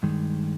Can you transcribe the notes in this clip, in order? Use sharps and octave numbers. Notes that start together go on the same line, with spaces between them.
G2 D#3 G#3